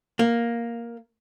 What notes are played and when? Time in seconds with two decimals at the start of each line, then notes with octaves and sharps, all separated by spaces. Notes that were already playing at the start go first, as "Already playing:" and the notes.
0.19 A#3